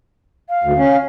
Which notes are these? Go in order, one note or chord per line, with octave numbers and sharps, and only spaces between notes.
F5
D2
C#4